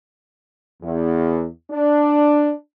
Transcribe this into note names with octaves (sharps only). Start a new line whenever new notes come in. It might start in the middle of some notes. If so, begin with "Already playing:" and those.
E2
D4